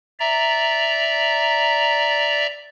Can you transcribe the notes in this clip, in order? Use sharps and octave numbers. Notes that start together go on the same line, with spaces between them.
D5 E5 A#5